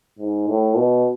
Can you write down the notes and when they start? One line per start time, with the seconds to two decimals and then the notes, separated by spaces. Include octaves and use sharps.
0.19 G#2
0.48 A2
0.76 B2